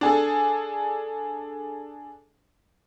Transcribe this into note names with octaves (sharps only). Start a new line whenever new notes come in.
D4 G#4 A4